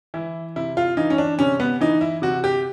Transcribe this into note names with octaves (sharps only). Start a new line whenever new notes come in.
E3 E4
C3 E4
F4
E3 D#4
C#4
D4
C3 C#4
B3
E3 D#4
E4
C3 F#4
G4